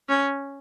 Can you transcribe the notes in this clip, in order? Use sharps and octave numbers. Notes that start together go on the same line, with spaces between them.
C#4